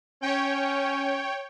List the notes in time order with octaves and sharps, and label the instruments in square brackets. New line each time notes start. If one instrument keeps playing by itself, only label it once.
[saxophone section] C#4 [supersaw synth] C#5 G5